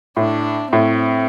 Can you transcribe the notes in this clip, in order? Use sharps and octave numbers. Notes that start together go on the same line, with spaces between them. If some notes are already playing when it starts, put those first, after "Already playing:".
A2 D4
A2 C4